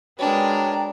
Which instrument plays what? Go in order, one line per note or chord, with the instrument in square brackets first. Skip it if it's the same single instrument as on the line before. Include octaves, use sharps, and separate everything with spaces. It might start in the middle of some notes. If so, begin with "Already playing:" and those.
[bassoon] F#3 [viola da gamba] G#3 A#4 B4 [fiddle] D4 [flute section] D5 G5 A#5